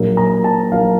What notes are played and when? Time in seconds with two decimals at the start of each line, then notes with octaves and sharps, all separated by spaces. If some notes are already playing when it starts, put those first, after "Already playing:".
Already playing: A#1 A#2 F#3 A#3
0.17 A#5
0.44 A5
0.72 A#1 A#2 F#3 A#3 F5